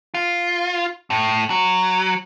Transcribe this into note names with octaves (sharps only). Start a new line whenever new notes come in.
F4
A2
F#3